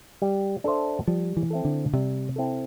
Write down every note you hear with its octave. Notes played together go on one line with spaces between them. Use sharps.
G3
D4 A4 C5 E5
F3 G3
E3
C4 E4 A4
D3
C3 G3
C4 E4 A4